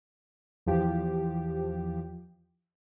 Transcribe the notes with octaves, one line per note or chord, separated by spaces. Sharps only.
E2 F3 G4